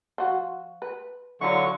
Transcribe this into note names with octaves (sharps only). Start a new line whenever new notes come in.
F3 F#4
B4
D3 F#3 E4 F4 C#6